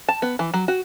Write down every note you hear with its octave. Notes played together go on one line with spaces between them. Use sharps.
A5
B3
E3
F#3
F#4